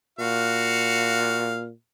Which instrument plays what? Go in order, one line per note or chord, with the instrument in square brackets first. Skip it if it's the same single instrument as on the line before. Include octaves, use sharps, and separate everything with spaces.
[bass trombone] A#2 [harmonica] F#4 F5